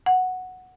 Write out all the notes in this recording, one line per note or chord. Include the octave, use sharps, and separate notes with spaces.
F#5